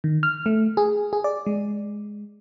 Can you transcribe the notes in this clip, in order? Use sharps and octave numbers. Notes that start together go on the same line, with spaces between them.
D#3
F6
A3
G#4
G#4
D5
G#3